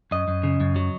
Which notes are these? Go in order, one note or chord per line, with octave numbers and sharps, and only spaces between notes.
F#2 D#5
F#2
C#3
F#2
F#3